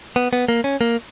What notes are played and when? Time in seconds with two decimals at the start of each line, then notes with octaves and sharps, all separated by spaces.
0.16 B3
0.33 B3
0.49 A#3
0.64 C#4
0.81 A#3